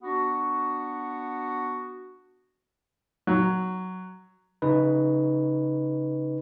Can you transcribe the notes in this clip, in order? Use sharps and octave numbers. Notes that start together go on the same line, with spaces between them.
B3 D4 F#4
F#3
C#3 D#4 B4